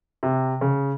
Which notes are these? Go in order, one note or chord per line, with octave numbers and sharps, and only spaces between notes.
C3
C#3